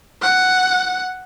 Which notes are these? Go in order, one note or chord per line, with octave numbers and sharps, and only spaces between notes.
F#5